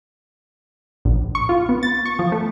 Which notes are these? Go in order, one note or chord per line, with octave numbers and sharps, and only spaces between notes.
A#1
C#6
F4
B3
A6
C#6
F3
A3